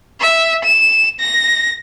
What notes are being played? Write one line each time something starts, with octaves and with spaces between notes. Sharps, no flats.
E5
E7
A#6